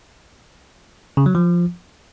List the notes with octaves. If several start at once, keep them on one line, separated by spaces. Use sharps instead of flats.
C#3
F#3
F3